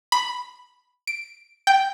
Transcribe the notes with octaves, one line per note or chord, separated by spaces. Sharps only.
B5
D7
G5